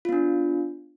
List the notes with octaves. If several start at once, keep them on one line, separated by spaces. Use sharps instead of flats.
B3 D4 F4